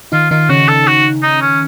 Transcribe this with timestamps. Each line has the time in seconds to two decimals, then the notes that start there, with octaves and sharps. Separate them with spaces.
0.12 D#3 D#4 F4
0.31 D#3 D#4 F4
0.49 C#3 C#4 F#4
0.68 A4
0.87 F#4
1.23 D#4
1.41 C#4